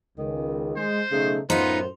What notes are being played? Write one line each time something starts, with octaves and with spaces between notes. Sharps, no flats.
C#2 D#3
G#3 C5
B1 C#3 A3 D#4
F#2 A2 B3 D#4 F4 C5